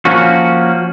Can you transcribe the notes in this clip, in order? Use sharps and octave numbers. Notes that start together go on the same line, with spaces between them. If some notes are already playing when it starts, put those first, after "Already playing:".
F3 A#3 C#4 F#4